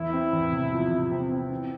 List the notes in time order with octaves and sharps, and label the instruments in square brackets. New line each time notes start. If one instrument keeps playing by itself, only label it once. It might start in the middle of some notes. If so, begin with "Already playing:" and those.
Already playing: [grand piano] E2 [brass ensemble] E4
[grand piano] C4
E2
C3
F3
C3
C4
C4
E3